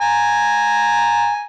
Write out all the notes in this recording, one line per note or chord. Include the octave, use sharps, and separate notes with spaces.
G#5 A#5